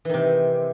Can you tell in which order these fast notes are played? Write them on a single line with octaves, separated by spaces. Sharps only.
E3 D#3 C3